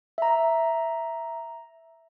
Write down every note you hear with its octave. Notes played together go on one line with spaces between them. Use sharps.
E5 A#5